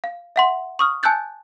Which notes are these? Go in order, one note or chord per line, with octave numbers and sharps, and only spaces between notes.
F5
E5 F#5 C6
C#6 D#6 F6
G#5 A5 E6 F#6 G6 A6